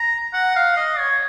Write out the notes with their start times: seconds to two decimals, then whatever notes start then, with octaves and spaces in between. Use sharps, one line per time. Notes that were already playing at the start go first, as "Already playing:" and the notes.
Already playing: A#5
0.33 F#5
0.56 F5
0.77 D#5
0.99 C#5